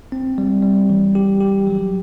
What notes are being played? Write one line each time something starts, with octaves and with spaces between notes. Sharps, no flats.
C4
G3
G3
E3
G4
G4
F#3